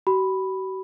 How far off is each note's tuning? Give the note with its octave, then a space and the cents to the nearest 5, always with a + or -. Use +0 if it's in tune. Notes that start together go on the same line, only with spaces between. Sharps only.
F#4 +45 B5 +0